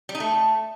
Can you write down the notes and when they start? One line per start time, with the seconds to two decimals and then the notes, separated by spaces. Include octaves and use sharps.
0.09 G3
0.15 D#4
0.20 A3